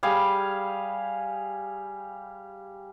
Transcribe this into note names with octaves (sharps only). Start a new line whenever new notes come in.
G3 G#4 F5